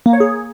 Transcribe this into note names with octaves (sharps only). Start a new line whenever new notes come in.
A#3
C#5
G#4